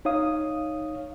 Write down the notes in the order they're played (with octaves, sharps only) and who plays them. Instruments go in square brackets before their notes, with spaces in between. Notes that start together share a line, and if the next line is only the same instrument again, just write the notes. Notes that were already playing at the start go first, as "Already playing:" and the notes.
[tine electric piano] D#4 C#5 F5 D#6